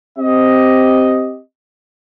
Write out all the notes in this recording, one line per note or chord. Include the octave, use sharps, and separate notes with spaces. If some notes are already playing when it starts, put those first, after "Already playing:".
C4 G4 D#5